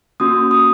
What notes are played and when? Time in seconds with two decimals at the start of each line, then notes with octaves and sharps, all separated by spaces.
0.20 A#3 C#4 F#4 D#6
0.51 D#6